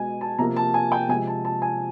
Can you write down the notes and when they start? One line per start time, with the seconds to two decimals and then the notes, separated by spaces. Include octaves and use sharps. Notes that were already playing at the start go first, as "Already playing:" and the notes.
Already playing: B2 G#3 G#5
0.21 A5
0.39 C3 F3 A#3 A#5
0.56 A5
0.74 G#5
0.92 G5
1.09 C3 F3 G#3 G#5
1.27 A5
1.45 A5
1.62 G#5